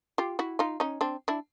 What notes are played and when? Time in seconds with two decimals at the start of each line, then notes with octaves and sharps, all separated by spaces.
0.18 F4 G4
0.39 E4 F#4
0.59 D#4 F4
0.80 C#4 D#4
1.01 C4 D4
1.28 D4 E4